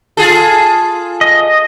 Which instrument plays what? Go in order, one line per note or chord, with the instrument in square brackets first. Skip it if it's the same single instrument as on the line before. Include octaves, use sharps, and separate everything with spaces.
[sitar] F4 G#4 A4
[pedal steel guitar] D#5